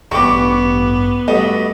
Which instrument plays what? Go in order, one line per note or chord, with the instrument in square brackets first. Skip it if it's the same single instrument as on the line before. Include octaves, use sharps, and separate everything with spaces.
[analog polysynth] A1 G2 [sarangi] B3 [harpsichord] D4 G4 [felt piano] C#6 D6
[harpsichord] G2 A3 [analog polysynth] F#4 B5 [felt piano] D#5